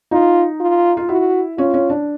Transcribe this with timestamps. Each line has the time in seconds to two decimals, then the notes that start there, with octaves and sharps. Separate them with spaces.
0.11 D#4 F4
0.60 F4
0.97 F4
1.09 E4 F#4
1.58 C#4 F4
1.74 C#4
1.90 D4